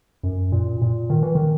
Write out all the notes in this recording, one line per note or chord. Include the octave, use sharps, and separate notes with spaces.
F#2
A#2
A#2
D#3
E3
D#3